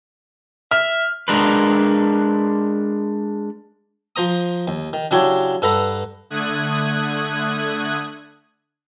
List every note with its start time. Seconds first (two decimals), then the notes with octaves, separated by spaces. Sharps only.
0.71 E5 F6
1.28 G#3 D4 A#4 B4
4.16 F3 C5 A#5 D#6
4.68 D#2
4.93 D#3
5.11 C#3 F#3 D4 E4 G4 C#5
5.62 G2 A4 B4 F#5 A#5 B5
6.30 D3 A3 D#6 F#6 G#6